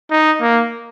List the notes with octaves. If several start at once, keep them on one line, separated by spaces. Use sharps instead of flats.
D#4
A#3